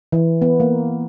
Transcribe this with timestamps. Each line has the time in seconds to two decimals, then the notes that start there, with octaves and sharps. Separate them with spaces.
0.12 E3
0.42 B3
0.60 A#3